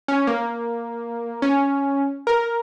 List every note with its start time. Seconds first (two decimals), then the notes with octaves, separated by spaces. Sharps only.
0.08 C#4
0.27 A#3
1.42 C#4
2.27 A#4